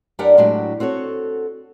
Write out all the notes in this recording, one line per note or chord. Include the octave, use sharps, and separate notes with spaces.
F#2 D4 G4 A#4 D5 F#5
A2 F#3 G#3 D4 F#4 G4
C4 F#4 A4 C#5